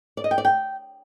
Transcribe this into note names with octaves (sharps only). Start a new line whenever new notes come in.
D5
D#5
G5
D5
G5